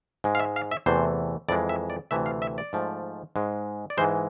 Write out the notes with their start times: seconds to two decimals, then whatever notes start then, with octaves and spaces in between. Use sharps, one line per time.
0.24 G#2 G#3
0.35 F5
0.40 E5
0.56 F5
0.71 E5
0.86 E2 C3 E3 A3 C5
1.49 F2 E3 G#3 D5
1.69 E5
1.90 D5
2.11 D2 C3 E3 A3 E5
2.26 F5
2.42 E5
2.58 D5
2.73 G#2 F3 A3
3.36 G#2 G#3
3.90 D5
3.97 G#2 E3 G#3 C5